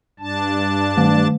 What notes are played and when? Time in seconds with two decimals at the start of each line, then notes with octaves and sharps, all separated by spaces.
0.19 G2 D4 A5
0.97 D#3 A3